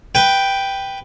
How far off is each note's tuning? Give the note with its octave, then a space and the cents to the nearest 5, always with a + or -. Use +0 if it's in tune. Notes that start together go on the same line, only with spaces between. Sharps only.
B4 +0 G5 +0